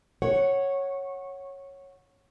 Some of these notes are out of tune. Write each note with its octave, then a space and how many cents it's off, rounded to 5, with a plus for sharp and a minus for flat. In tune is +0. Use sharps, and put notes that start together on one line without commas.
C#5 -10 F#5 +0